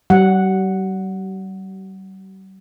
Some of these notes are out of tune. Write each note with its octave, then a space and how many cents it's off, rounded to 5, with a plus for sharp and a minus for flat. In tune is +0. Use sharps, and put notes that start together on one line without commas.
G3 -45 F#5 +0